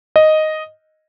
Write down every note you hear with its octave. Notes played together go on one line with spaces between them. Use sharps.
D#5